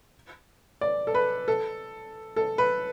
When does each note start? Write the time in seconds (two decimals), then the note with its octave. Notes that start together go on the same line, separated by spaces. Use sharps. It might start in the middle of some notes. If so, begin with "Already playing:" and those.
0.81 D5
1.07 A4
1.15 B4
1.48 A4
2.36 A4
2.58 B4